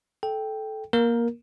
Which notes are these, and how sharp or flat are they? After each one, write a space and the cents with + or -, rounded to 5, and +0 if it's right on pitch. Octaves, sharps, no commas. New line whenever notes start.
A4 -15 G5 +0
A#3 +15 A#4 +5